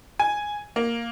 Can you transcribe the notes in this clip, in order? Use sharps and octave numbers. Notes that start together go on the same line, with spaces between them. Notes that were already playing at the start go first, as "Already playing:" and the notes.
G#5
A#3